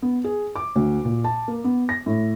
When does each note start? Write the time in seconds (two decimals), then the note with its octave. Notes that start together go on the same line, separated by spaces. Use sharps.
0.02 B3
0.24 G#4
0.56 D6
0.75 D2
1.05 A#2
1.24 A5
1.48 A#3
1.64 B3
1.89 A#6
2.06 A2